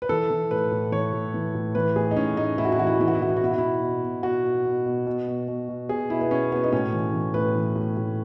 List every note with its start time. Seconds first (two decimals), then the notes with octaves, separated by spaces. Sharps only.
0.02 B4
0.09 E3 A4
0.30 E3
0.51 A2 B4
0.72 A2
0.92 E3 C#5
1.13 A2
1.34 E3
1.55 A2
1.75 E3 B4
1.96 A2 G#4
2.11 D#4
2.16 A2 C#4
2.37 A2 D#4
2.58 A2 E4
2.65 F#4
2.72 E4
2.79 E3 F#4
2.87 E4
2.94 F#4
3.00 E3 E4
3.08 F#4
3.15 E4
3.20 E3 F#4
3.30 E4
3.37 F#4
3.41 B2 E4
3.51 F#4
3.58 B2 E4
3.83 B2
4.03 B2
4.23 B2 F#4
4.44 B2
4.66 B2
4.86 B2
5.07 B2
5.28 B2
5.48 B2
5.69 B2
5.89 B2 G#4
6.10 B2 E4
6.21 B3
6.31 B2 C#4
6.52 B2 B3
6.64 D#4
6.73 A2 C#4
6.93 E3
7.14 E3
7.34 A2 B4
7.56 E3
7.76 A2
7.97 A2